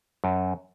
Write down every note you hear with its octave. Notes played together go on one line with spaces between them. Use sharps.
F#2